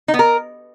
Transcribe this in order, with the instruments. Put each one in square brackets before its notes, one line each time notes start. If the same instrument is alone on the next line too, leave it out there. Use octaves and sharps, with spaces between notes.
[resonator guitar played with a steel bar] D#4
B3
A#4